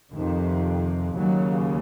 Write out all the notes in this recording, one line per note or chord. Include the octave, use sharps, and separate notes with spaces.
F2 C3 D#3
D#2 C#3 F#3